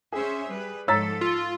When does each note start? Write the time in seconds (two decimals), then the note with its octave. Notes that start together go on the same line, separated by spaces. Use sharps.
0.12 C#4 G#4 C5 E5
0.50 G3 B4
0.88 G#2 F3 A4 C#5 A#5 E6 A6 B6
1.21 F4